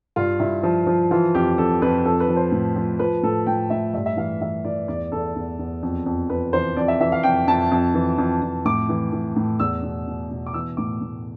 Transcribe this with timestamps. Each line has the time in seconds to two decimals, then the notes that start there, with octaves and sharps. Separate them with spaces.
0.16 G2 F4
0.40 G2 E4
0.63 F3
0.87 F3
1.11 E3 F4
1.35 F2 G4
1.58 F2 A4
1.82 F2 B4
2.05 F3 A4
2.20 B4
2.28 F3
2.36 C5
2.52 A2
2.76 F3
2.99 F3 B4
3.23 A2 A4
3.47 A2 G5
3.70 A2 E5
3.94 G2 E5
4.06 E5
4.17 E3 F5
4.41 E3 E5
4.65 E3 D5
4.88 E2 D5
5.12 E2 A4
5.36 E2
5.59 E2
5.83 F2
6.06 F2
6.30 F2 B4
6.53 E3 C5
6.76 F2 D5
6.88 E5
7.00 E3 E5
7.12 F5
7.23 F2 G5
7.47 F2 A5
7.71 F2
7.94 E3
8.18 F2
8.42 F2
8.65 A2 D6
8.89 E3
9.13 E3
9.36 A2
9.60 E2 E6
9.83 B2
10.07 B2
10.31 B2
10.46 D6
10.54 E3 E6
10.77 A2 D6
11.02 A2